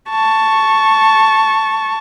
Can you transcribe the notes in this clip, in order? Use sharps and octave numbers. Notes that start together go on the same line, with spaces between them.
A5 C#6